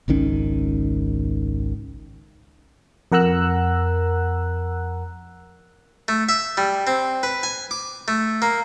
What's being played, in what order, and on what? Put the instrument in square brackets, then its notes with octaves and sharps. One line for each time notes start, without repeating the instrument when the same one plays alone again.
[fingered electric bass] G#1 C#2 D#3 C#4
[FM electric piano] F2 A#4 F#5 A#5 E6 F#6
[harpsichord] A3
E5
G3
C4
B4
G#5
D6
A3
A#3